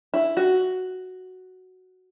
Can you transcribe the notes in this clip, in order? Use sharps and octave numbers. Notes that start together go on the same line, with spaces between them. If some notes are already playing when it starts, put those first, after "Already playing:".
E4
F#4